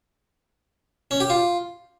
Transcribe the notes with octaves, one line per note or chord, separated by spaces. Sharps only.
C#4
G4
F4